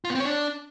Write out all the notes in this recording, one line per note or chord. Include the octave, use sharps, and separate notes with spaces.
F4
B3
C4
C#5
D4